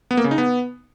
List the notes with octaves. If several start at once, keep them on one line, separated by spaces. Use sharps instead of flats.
B3
A#3
C#3
D#4
B3